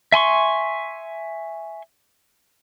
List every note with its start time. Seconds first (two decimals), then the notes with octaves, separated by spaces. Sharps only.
0.12 E5 G#5 C6 C#6